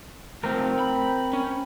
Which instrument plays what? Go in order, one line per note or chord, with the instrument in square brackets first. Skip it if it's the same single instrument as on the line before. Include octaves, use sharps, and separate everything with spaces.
[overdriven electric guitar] C3 A3 [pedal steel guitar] C4 A#4
[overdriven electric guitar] B5
C#4